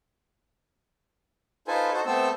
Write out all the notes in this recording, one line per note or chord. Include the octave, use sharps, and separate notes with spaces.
D#4 F4 A4 B4 C5 G#5
D#4 F#4 A4 C5
A3 B3 C4 A4 C5 E6